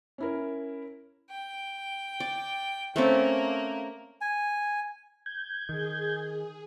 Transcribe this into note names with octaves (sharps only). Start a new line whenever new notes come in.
C#4 E4 A#4
G5
D5
A3 A#3 C4 C#4
G#5
G6 G#6
D#3 G#4